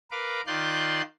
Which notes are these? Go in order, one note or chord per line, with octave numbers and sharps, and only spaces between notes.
A#4 B4 F5 D6
D#3 F4 D5 C6 F#6 G6